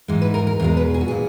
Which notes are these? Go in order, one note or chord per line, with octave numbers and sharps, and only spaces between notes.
G#2 E3 G#3
B4
A#4
A#4
E2 B2 G#3 A#4
B4
G#4
F#4
A#2 G#4